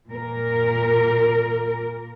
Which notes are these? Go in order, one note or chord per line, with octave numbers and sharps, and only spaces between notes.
A#2 A#4